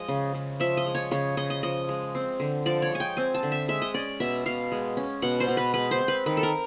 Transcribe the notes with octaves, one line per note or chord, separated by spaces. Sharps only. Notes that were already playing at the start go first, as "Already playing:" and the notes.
Already playing: F3 G#3 D#5
C#3
C#3
F3 E5
D#5
G#3
C#5
C#3 C#5
C#3 D#5
D#5
F3 D#5
G#3
C4
D3
F3 D5
C#5
G#3 G#5
G5
C4 G#5
A5
D3
E5
G#3 E5
D#5
C#4 D5
B2 E5
B2 F5
G#3
C#4
B2 F#5
C5
B2
B4
G#3 B4
C5
C4
B4
D#3 B4
A4
A#4